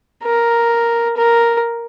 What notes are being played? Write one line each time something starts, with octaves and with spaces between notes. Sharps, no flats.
A#4
A#4